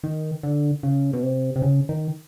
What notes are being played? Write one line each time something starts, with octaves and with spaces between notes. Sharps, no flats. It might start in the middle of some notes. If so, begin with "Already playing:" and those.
D#3
D3
C#3
B2
C3
C3
C#3
D#3